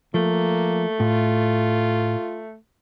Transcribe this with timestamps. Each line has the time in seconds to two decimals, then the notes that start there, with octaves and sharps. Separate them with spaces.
0.14 F3 A3 A#3
1.00 A2 F4